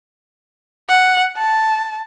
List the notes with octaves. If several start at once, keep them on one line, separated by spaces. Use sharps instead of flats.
F#5
A5